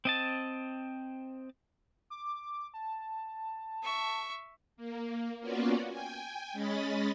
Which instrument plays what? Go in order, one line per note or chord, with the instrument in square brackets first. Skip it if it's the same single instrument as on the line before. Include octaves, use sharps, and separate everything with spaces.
[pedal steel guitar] C4 D#5 A5
[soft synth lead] D6
A5
[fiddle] E5 C#6
[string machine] A#3
A#3 B3 C#4 F4 F#4 D5
G5 G#5
G#3 C#4 D#5 B5 A6